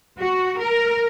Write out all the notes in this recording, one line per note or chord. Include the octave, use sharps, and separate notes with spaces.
F#4
A#4